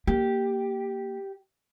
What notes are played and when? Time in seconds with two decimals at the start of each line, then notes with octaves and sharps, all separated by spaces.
0.07 A#3 G4